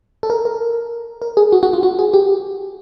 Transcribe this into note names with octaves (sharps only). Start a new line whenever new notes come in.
A4
A#4
A#4
A#4
G#4
F#4
F#4
F4
F#4
G#4
G4